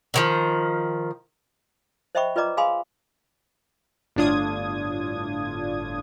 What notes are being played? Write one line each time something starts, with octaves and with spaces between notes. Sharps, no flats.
D3 D#3 F3
C5 D#5 E5 G5 B5 C#6
F4 B4 D5 D#5 A#5 D6
G#4 F5 G#5 B5 C6 D#6
G1 A2 D4 F4 D#6 G#6